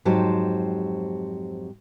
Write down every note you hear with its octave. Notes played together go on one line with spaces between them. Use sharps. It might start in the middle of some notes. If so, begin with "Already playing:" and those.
F2 G#2 F#3 G4 C5 A5